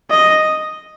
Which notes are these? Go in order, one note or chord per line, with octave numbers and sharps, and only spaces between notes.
D#5